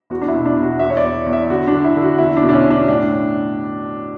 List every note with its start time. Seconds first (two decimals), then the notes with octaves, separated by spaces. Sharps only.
0.10 E2 F#4
0.21 D4
0.28 E4
0.34 B2
0.46 D4
0.56 B2
0.63 F#4
0.79 E2 E5
0.90 C#5
0.97 D5
1.03 E2
1.26 E2
1.33 E5
1.50 D3 F#4
1.67 D4
1.73 D3
1.84 E4
1.96 D3
2.02 F#4
2.18 E2 E4
2.37 D4
2.43 B2
2.49 D4
2.53 C#4
2.66 B2 D4
2.88 A2 D4